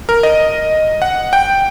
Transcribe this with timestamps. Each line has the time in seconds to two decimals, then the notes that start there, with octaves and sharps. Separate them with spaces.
0.09 A#4
0.23 D#5
1.02 F#5
1.33 G5